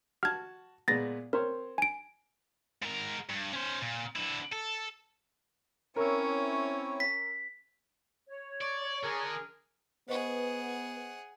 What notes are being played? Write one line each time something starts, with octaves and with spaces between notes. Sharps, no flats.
F#4 A5 F6 G#6
A#2 G#3 B3 A6 A#6
C4 A#4 C5 C#5
G#5 D7
G#2 A#4
G2
C#4 C5
A#2
D3 E4
A4
C4 C#4 E4 A#4 C#5 E6
B6
C#5
D5 C#6
D3 G#4 A#4
B3 G#4 B4 C5 D#5 F#5 C#6